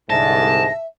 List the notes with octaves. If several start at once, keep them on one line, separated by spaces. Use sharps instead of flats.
C2 G#2 D3 E5 A5 A#6